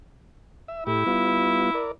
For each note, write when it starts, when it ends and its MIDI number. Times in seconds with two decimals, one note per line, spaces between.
0.68 0.84 76
0.87 1.04 45
0.87 1.91 64
0.87 1.04 67
1.07 1.71 55
1.07 1.71 59
1.07 1.71 65
1.75 1.92 70
1.75 1.92 74